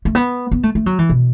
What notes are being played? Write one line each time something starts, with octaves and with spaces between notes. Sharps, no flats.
A3
B3
B3
A3
A3
F#3
E3
B2